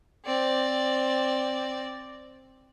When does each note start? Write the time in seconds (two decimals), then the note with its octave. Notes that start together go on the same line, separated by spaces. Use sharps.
0.25 C4 D5